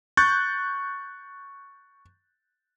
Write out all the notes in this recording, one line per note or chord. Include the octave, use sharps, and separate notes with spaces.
C#6 F#6 G6 A6